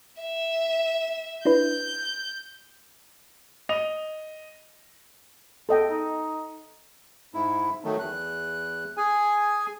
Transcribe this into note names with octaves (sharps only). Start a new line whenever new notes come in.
E5
D4 E4 B4 G6
D#5 F7
E2 A4 D#5 G5
D#4
G#2 E4
D#3 F#3 A3
E2 F#6
G#4 G#5